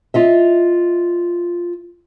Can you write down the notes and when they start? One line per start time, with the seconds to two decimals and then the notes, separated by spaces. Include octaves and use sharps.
0.14 F4 D#5 E5